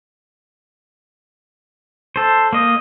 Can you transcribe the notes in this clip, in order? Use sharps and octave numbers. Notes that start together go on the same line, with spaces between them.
A4 C5
A#3 D#5